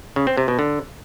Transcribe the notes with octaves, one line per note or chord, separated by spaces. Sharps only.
C#3
C4
C3
B2
D3